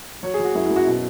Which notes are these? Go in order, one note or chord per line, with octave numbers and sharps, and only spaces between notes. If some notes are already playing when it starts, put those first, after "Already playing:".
F#3 C#5
G#4
F#3
F#4
F#2 E4
E4
F#2
F#4
B2